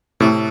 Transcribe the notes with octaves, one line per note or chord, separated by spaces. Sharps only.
A2 C3 A3